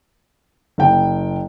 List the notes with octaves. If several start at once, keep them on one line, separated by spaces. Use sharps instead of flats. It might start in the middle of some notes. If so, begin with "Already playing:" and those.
F#1 G5